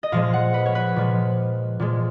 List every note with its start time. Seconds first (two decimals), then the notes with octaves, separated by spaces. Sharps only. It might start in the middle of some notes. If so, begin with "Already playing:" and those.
0.03 D#5
0.12 A#2 F3 G#3 F5
0.33 F#5
0.54 B4
0.66 C#5
0.75 B4
0.96 A#2 F3 G#3
1.80 A#2 F3 G#3